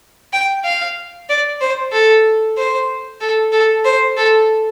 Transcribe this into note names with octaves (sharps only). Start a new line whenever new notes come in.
G5
F5
D5
C5
A4
C5
A4
A4
C5
A4